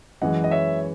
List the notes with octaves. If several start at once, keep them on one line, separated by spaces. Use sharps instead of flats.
F#2 E3 G#3 D#5 F#5
D#5
C#5 E5